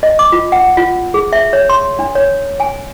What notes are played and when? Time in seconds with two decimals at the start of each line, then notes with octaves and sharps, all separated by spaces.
0.03 D#5
0.19 D6
0.32 F4
0.52 F#5
0.77 F4
1.14 G#4
1.33 E5
1.53 C#5
1.69 C6
1.99 D4
2.15 C#5
2.60 G#5